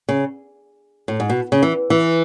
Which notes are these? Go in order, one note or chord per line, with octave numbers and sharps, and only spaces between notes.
C#3
A2
G#2
B2
C#3
E3
E3